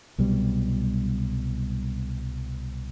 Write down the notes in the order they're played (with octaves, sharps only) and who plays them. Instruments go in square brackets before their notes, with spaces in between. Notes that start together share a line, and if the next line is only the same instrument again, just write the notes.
[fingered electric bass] C2 B2 F#3 G3